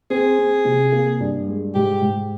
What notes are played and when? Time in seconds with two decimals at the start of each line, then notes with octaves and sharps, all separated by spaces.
0.10 C4 G#4
0.39 C4
0.65 C3
0.92 A#3
1.20 G2
1.48 G#3
1.75 G#2 G4
2.02 G#2